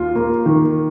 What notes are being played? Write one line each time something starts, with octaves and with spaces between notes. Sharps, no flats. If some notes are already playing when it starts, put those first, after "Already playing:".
Already playing: D#2 F4
A#3
D#3